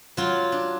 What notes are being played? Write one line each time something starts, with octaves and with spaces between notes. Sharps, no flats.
F#3 F4
D4